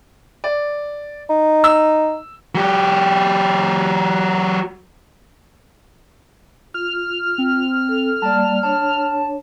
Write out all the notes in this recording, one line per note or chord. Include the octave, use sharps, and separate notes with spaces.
D5
D#4
E6
F#3 G4
F4 F6
C4
A4
G3 A#3 D5 A5
D4 C#5 A5